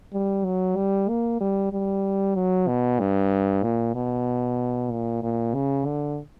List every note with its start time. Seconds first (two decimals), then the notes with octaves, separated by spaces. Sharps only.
0.13 G3
0.44 F#3
0.76 G3
1.09 A#3
1.41 G3
1.73 G3
2.35 F#3
2.68 B2
3.00 G2
3.63 A#2
3.95 B2
4.91 A#2
5.23 A#2
5.54 C#3
5.86 D3